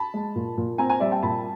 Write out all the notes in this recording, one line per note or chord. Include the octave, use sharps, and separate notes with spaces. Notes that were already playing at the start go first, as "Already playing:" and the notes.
Already playing: A5 B5
G#3
A#2
A#2
C4 G#5 A#5
G#5 A#5
G3 D5 E5
G5 A5
A#2 A5 B5